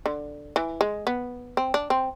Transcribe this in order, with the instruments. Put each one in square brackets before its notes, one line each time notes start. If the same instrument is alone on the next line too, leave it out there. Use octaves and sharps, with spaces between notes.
[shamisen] D3
E3
G#3
B3
C4
D4
C4